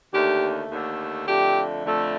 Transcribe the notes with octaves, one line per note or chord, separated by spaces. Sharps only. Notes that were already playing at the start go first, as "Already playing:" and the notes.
D#2 D3 A3 G4
D#2 D3 A3
F2 D3 A3 G4
F2 D3 A3